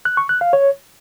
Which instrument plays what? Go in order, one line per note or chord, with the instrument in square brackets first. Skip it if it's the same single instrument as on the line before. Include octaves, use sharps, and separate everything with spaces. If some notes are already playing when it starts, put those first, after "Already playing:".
[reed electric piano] F#6
C#6
F#6
F5
C#5